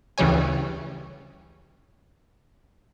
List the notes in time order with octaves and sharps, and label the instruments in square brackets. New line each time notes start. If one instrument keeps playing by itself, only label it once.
[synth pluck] D2 C#3 E3 G3 C#5 G#5